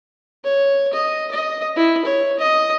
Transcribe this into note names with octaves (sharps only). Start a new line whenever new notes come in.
C#5
D#5
D#5
E4
C#5
D#5